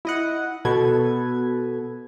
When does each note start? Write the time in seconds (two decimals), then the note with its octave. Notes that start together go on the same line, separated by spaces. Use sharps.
0.05 E4 D#5 F#5
0.65 B2 A4 B4 G#6